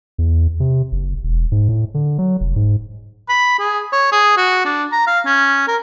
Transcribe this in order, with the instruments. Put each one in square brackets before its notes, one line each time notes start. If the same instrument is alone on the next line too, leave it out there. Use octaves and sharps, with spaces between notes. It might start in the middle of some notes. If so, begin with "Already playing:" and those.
[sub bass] E2
C3
F#1
E1
G#2
A2
D3
F#3
F1
G#2
[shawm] B5
G#4
C#5
G#4
F#4
D4
A#5
F5
C#4
A#4